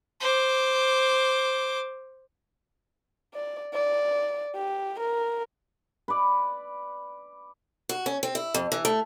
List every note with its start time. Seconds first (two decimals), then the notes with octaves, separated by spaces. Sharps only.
0.21 C5 D6
3.34 D5
3.74 D5
4.56 G4
4.99 A#4
6.08 B4 D5
7.89 F#4
8.06 C#4
8.23 C4
8.35 E4
8.54 F2
8.72 E3
8.85 A3